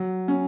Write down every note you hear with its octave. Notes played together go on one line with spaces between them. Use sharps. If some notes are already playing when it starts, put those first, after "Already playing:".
Already playing: F#3
C#4